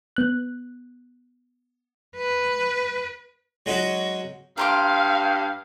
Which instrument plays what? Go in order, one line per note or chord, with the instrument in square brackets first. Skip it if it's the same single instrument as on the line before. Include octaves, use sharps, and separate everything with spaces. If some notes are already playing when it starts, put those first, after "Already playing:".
[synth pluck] B3 F#6
[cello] B4
[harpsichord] F#3 G#3 C#4 D#4 F#4
[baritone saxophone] G2 [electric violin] F5 [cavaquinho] A#5 C6 D6